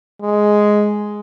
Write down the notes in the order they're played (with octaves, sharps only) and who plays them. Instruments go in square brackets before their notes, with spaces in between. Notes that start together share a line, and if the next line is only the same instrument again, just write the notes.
[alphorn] G#3